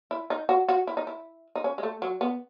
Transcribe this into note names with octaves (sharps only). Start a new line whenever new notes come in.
E4
D#4
F#4
F#4
E4
D#4
E4
D#4
C#4
G#3
A3
F#3
B3